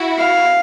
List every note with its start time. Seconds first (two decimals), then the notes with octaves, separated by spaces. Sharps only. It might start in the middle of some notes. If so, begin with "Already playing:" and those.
Already playing: E4 F#4
0.19 F5